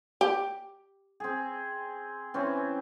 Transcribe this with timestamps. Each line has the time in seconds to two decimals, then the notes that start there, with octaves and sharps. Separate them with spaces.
0.21 G4
1.20 C4 G#4
2.34 E3 C4 C#4